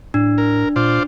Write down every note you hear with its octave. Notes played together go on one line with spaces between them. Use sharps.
A2 D4
A#4
A#2 F4 C5 D5